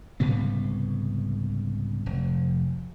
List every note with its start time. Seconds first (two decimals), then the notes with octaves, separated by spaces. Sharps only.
0.20 C2 G#2 C#3 B3
2.06 F1